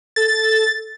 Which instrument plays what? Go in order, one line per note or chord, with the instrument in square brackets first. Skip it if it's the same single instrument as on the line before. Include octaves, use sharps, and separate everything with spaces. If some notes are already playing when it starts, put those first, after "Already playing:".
[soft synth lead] A4 [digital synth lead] A6